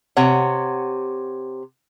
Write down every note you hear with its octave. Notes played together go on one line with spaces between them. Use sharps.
C3 C#5 F#5